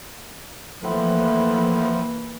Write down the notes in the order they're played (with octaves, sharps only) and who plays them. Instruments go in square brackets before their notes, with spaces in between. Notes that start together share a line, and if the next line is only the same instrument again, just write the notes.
[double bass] E3 A#3 [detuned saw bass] F3 [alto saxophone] A3 [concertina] C4 E4 F#5